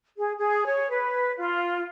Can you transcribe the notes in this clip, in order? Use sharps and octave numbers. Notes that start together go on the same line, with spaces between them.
G#4
G#4
C#5
B4
F4